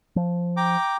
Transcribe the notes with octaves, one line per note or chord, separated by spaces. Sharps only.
F3
G5 A#5 D6